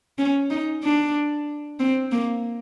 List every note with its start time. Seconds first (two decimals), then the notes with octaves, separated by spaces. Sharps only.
0.18 C#4
0.50 D#4
0.83 D4
1.79 C4
2.12 A#3